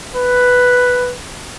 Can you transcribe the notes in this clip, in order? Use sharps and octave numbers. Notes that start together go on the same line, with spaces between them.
B4